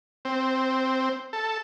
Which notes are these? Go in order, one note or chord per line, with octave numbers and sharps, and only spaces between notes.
C4
A4